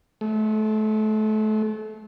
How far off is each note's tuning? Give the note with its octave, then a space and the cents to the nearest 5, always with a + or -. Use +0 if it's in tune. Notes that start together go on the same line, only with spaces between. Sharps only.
A3 -30